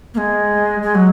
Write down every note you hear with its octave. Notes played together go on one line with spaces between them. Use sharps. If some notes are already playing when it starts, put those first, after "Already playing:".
A#3
G#3
G#3
F#3